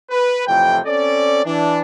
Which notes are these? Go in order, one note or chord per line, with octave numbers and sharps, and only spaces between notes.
B4
F2 A2 C3 E3 G5
C4 C#4 A4 D5
E3 D4